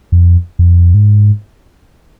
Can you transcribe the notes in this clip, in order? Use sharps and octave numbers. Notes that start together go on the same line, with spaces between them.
F2
F2
G#2